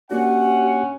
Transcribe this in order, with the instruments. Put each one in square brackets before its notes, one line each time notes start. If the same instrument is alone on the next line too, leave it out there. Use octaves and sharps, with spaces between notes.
[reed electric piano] A#3 D4 F#4 [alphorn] C#4 [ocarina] G4 [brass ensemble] F#5